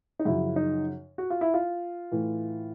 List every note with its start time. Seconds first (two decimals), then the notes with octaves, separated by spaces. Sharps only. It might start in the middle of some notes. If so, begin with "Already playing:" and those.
0.19 D#4
0.25 F#2 C#3 F3 E4
0.56 D#4
1.18 F#4
1.30 F4
1.41 E4
1.54 F4
2.12 A2 E3